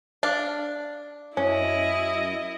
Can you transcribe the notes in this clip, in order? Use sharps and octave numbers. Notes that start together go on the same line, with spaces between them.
D4 F5
F#2 C#4 E4 D#5